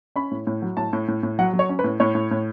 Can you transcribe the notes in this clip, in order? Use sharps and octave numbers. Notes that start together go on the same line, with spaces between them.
C#4 B5
A2
A2
F#3
A2 A5
A2
A2
A2
F#3 F#5
F#3
C#5
C#4
B4
A2
A2 C#5
A2
A2